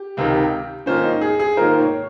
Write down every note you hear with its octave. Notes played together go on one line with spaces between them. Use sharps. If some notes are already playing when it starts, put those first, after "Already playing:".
Already playing: G4
C#2 C3 D#3
G#2 D#3 A#3 C#4 F4 C5
D#4
G#4
G#4
G#2 D#3 A#3 F4 A#4 C5
C#5